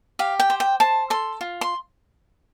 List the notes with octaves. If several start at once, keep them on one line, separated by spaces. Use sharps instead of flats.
G4 F5
G5
C5
G5
C5 A5
A4 C6
F4
C6